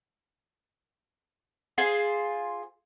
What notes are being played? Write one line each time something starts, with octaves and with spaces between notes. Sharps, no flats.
F4 G#4 C5